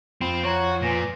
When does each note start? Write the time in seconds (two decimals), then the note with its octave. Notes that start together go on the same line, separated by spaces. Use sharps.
0.21 F2 F3 C4 B5
0.44 F#4 C#5 A#5 G#6
0.82 A#2 B4 G#5 A#6